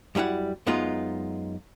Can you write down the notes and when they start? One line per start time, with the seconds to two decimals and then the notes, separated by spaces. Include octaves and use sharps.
0.15 F#2 F#3 G3 E4 F#5
0.66 F#2 G#3 B3 D#4 F4